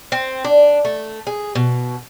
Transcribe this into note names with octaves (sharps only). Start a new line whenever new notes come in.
C4
D4
A3
G#4
B2